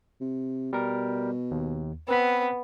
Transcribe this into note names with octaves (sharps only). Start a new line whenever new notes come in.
C3
B2 G3 A#4
D#2
B3 C4 B4 B5